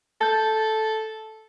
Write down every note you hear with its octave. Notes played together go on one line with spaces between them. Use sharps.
A4 A5 G6